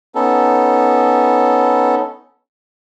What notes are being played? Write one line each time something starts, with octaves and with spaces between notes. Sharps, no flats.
B3 C#4 D#4 A4